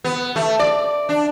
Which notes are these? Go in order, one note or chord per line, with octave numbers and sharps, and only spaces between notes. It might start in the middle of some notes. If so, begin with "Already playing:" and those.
B3
A3
D5
D4